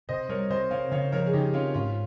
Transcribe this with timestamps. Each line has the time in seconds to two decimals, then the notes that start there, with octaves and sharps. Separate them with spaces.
0.09 C3 C5 D#5
0.29 G3 A#4 C#5
0.50 C3 C5 D#5
0.71 C4 C#5 F5
0.92 C#3 C#5 F5
1.12 F3 A#4 C#5
1.26 G#4
1.33 C#3 D#4 G4
1.53 C4 C#4 F4
1.74 G#2 C#4 F4